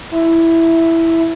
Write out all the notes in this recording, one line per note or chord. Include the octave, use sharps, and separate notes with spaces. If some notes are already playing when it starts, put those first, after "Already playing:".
E4